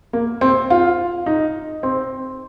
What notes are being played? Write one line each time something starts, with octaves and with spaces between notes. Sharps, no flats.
A#3
C4
F4
D#4
C4